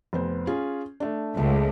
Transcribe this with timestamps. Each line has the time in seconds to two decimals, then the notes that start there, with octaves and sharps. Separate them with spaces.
0.13 F1 B3 C5
0.47 C#4 F4 G#4
1.00 A3 D4
1.37 C#2 A3